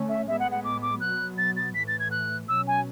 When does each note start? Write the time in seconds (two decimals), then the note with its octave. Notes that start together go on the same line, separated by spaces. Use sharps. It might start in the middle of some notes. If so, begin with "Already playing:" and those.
Already playing: D3 A3 C#4
0.09 E5
0.28 A2 G#3 B3 E5
0.40 F#5
0.51 F#5
0.64 D6
0.82 D6
1.01 B2 F#3 B3 F#6
1.38 A6
1.57 A6
1.74 A2 E3 A3 B6
1.88 A6
2.00 G#6
2.11 F#6
2.49 B2 F#3 C#4 E6
2.67 G#5